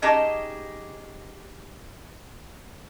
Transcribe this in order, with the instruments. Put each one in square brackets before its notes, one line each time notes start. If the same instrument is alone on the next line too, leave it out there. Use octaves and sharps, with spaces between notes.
[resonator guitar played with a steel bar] C#4 D#4 G4 G#4 D#5 A5